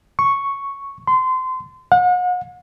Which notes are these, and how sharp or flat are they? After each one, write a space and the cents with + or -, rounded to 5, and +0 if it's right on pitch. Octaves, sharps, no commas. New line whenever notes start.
C#6 +0
C6 -25
F#5 -40